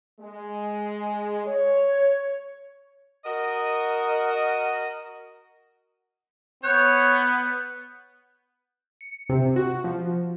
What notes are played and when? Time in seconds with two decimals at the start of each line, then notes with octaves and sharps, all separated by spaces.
0.20 G#3
1.46 C#5
3.25 F#4 A#4 D#5
6.63 B3 C#5 F#6 G6
9.01 C#7
9.29 C3
9.56 F#4
9.84 F3